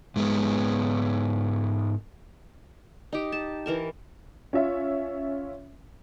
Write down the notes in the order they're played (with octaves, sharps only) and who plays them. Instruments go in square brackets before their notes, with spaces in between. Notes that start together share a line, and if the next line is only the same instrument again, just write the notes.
[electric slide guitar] G#2 G#3 B3
[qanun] D#4 G4
A5
E3 A#4 A5
[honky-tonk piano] C#4 F4 E5